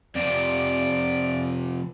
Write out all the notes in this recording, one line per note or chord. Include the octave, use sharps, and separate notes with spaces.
F2 C3 D5